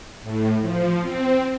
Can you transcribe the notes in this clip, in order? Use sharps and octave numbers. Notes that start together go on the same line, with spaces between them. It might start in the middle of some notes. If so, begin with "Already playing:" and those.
A2
F3
C4